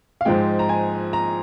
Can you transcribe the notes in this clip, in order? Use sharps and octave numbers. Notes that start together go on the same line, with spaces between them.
F5
G#2 F3 G#3 G5
A#5
G#5
A#5